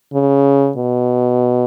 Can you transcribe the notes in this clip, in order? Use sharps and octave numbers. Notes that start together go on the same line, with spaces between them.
C#3
B2